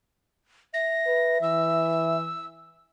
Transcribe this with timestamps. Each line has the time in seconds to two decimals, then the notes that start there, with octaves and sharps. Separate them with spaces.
0.74 E5 A#6
1.07 B4
1.42 E3 E6